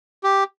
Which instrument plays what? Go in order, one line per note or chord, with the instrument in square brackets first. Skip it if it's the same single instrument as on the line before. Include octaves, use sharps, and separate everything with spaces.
[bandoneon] G4